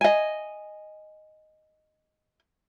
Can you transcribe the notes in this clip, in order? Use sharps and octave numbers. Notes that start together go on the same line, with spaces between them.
D#5 G#5